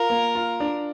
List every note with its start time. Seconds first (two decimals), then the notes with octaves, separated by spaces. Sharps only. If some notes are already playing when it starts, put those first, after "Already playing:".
Already playing: F4 A#4
0.10 A#3
0.35 F4
0.60 D4